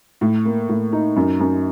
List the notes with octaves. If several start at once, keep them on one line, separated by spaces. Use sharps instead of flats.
A2
A#3
A2
D#4
F#2
F#2